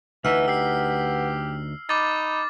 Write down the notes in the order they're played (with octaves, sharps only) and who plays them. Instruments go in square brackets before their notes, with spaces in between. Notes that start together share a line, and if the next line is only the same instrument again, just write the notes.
[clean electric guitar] D2 D#4 E5 [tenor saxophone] E3 [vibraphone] B4 F#5 [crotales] F6
[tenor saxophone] G4 [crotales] E6 C7
[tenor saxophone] D#4 [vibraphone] B5 [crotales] D6 A6